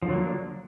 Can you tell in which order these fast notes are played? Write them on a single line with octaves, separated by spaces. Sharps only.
F3 D3 F#3 A#3 D4